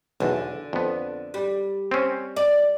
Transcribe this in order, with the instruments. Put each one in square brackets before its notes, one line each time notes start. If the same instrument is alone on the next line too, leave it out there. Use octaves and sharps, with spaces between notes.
[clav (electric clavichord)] B1 E2 [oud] D3
[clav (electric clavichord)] F2 B3
[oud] G3
[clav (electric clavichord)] C4 C#4
[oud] D5